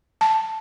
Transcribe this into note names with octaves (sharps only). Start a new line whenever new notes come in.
A5